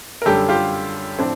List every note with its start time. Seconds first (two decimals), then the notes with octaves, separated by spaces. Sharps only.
0.22 A#4
0.25 F#2 D3 G3 G4 A4
0.49 F4 G4
1.19 A2 F3 C4 D4